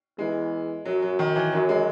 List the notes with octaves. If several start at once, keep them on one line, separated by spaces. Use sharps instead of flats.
E2 G#3
F#2 F#3
F#3
D#3
E3
F#2 F#3
G#3